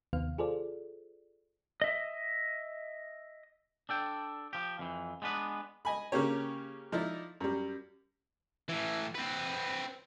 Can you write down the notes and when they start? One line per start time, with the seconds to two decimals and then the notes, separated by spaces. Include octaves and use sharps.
0.13 D#2 C3 D#3 B3 F5 F6
0.38 F4 G#4 A4 C5 D5
1.82 D#5 E5
3.89 D4 A4 G5
4.53 F3 G4
4.79 F2 E3
5.22 G#3 B3 D4 B4
5.85 D#5 G#5 B5
6.12 C#3 A#3 C#4 G4 C#5
6.92 F3 D#4 E4 D5 D#5
7.40 F#2 G3
8.69 A2 E3
9.15 C4 B4